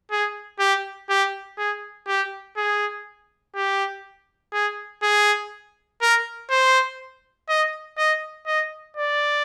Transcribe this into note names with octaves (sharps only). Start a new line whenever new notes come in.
G#4
G4
G4
G#4
G4
G#4
G4
G#4
G#4
A#4
C5
D#5
D#5
D#5
D5